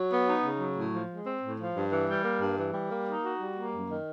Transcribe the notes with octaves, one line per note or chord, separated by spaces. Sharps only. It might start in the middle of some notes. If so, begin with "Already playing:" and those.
Already playing: F#3
B3
D#4
C#3
F#3
A2
F3
G#3
C4
A2
F3
G2
E3
G3
A#3
G2
E3
G3
A#3
D#4
F#4
G3
A#3
F#2
D#3